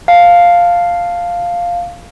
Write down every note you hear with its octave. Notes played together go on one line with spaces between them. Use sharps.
F5 A5